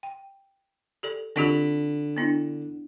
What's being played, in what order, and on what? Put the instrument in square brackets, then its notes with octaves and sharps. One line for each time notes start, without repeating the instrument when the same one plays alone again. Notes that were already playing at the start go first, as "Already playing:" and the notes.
[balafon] G5
G4 A4 D5
[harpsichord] D3 B5 [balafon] C4 F4 G4
[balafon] B3 D4 E4